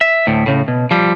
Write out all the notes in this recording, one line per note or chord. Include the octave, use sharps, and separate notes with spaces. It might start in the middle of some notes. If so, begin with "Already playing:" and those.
E5
D2 A2
A2 C#3
B2
F3 G3